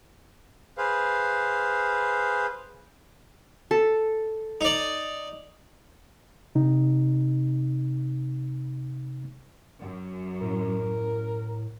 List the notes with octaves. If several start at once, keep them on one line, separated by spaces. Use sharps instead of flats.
G#4 B4 C5 F5
A4
D#4 D5
C3 D#4
F#2
A2 A#4